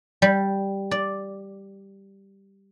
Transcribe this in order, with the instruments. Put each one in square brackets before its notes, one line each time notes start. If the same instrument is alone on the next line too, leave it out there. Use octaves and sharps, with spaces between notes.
[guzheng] G3
D5